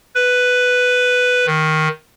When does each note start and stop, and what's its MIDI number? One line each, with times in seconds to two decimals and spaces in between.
0.15 1.46 71
1.46 1.88 51